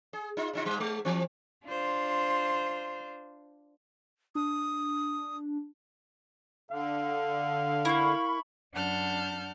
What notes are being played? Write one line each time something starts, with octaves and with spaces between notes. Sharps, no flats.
G#4
D#4 F4
C#3 D#4 F4
G#2 G3
G#3
E3 C4
D4 F4 C5
D4 D#6
D3 F5
A#3 E4 B5 C#6
F#2 D4 F#5 A5 F6 G6